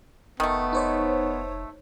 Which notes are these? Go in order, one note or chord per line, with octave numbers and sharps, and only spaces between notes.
F1 D#3 A3 B3
D#4 C5 C#5